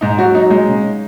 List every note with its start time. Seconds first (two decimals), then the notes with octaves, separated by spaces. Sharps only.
0.01 G#2 D#4
0.18 F#3 F#4
0.35 F#3 D#4
0.50 G#3 D#4
0.68 C#3